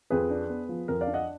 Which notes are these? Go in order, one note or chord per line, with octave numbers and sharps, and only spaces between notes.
F2 G#4 B4
D4
B3
F3
F2 A#4
D5 F5
D4
D#5 F#5